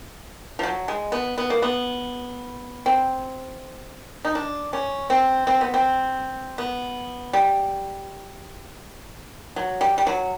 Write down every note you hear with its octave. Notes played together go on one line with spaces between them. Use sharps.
F3
F#3
G#3
B3
B3
A#3
B3
C4
D#4
D4
C#4
C4
C4
B3
C4
B3
G3
F#3
G3
G3
F#3